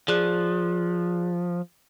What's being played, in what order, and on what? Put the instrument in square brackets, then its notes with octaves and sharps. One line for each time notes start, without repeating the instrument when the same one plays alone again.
[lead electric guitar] F3 [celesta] G#4 D5 F#6